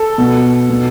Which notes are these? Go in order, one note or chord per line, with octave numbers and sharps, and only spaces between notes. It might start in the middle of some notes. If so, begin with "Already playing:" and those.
Already playing: A4
B2
B2